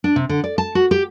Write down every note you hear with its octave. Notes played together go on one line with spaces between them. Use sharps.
D4
C3
D3
D5
A5
F#4
G4